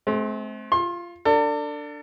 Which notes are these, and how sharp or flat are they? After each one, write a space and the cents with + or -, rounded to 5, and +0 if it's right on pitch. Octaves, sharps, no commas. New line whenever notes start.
A3 -45 C4 +0
F4 -15 C6 +35
D4 +0 A4 +40